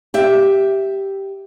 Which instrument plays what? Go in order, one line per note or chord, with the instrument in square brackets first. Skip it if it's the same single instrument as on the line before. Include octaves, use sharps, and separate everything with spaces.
[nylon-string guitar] G4 E5